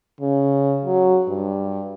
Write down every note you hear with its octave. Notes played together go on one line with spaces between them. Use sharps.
C#3
F#3
G2